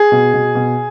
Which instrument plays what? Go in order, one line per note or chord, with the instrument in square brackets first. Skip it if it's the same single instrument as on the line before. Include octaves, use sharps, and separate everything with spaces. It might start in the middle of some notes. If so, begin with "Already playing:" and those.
Already playing: [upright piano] G#4
B2
B2
B2